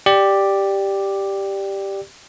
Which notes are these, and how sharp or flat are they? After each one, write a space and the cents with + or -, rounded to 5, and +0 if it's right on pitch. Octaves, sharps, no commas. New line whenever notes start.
G4 +0 D5 +5